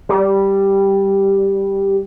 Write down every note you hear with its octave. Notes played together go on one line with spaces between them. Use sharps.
G3